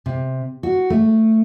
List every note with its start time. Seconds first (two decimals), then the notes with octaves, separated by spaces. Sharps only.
0.06 C3
0.63 F#4
0.90 A3